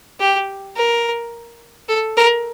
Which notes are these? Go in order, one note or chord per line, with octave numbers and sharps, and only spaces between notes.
G4
A#4
A4
A#4